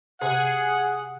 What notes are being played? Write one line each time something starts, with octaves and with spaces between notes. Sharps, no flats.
C3 G#4 F#5